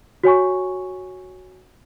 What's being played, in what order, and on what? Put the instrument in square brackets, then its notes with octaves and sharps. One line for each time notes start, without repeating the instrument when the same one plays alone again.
[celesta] F#4 C#5 G#5 C#6